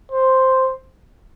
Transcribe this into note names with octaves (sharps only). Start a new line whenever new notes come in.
C5